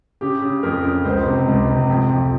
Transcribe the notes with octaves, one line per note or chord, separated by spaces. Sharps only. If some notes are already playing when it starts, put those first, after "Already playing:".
C#3 G4
C#3
F2 A#4
C#3
C#2 C5
C3
C#2
C3
F2
F2